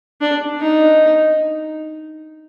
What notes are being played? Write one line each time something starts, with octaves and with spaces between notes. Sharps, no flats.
D4
D#4